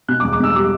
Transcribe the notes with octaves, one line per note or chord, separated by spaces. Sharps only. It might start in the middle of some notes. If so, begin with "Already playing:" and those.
B2 F#6
D6
E2
D6
E2 E6
G3 D6